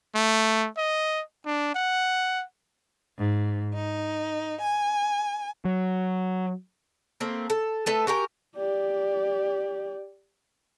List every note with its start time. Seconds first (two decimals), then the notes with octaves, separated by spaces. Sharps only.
0.15 A3
0.77 D#5
1.46 D4
1.75 F#5
3.19 G#2
3.75 D#4
4.61 G#5
5.65 F#3
7.20 A3 A#3 C4
7.50 A4
7.86 A3 A4 B4
8.07 F#4 G4 A#4 G#5
8.56 G4 D5